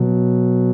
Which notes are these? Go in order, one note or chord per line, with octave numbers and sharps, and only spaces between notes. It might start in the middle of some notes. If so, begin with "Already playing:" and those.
Already playing: B2 F#3